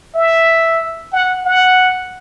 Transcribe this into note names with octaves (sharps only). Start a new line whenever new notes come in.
E5
F#5
F#5